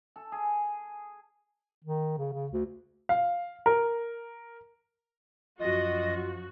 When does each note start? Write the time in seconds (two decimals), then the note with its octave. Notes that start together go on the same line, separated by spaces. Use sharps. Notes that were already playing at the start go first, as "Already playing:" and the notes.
0.16 A4
0.32 G#4
1.84 D#3
2.18 C#3
2.33 C#3
2.52 D2
3.09 F5
3.66 A#4
5.60 F#2 F3 F4 F#4 D#5